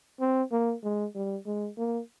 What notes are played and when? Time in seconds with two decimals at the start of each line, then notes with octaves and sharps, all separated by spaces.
0.20 C4
0.52 A#3
0.84 G#3
1.15 G3
1.46 G#3
1.78 A#3